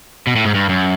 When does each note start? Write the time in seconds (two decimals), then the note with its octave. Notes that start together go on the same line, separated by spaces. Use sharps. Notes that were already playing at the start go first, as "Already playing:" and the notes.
0.27 B2
0.36 A2
0.45 G#2
0.55 G2
0.69 F#2